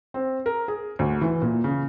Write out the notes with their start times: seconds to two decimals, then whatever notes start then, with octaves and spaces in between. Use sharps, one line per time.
0.14 C4
0.46 A#4
0.68 G#4
0.99 D2
1.21 E3
1.42 A#2
1.64 C#3